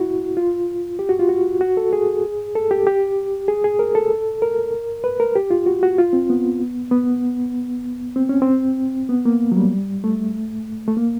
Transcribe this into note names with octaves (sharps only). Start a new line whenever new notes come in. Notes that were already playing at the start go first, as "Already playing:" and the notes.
Already playing: E4 F#4
F4
G4
F#4
F4
F#4
F#4
A4
G#4
A4
G4
G4
G#4
G#4
A#4
A4
A#4
B4
A#4
G4
F4
F#4
F#4
F4
C4
B3
B3
C4
C#4
C4
B3
A#3
F#3
G3
A3
A3
A#3